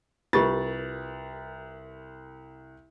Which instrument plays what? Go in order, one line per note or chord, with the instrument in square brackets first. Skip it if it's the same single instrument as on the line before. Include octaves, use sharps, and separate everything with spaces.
[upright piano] C2 A6 [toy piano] F4 G4 [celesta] A#4 B4